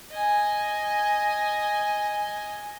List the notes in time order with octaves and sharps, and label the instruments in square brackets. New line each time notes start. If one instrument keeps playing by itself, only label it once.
[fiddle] D#5 G#5